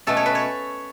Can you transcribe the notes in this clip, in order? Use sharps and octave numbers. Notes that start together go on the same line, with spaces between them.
B2 A3 C#4 A4
C#5
B4
C#5